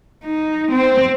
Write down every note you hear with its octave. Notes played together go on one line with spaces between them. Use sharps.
D#4
C4